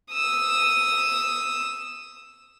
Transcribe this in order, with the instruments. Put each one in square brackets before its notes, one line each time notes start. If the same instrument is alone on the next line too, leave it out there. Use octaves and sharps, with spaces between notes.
[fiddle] D#6 E6